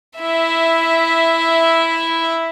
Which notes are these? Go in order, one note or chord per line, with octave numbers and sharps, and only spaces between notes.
E4 E5